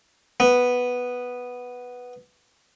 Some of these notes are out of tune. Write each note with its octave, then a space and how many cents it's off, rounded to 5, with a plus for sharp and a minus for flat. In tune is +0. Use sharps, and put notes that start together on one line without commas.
B3 +0